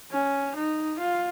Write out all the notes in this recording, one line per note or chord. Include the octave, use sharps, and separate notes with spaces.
C#4
D#4
F4